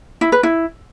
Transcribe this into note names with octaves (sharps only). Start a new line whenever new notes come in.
E4
B4
E4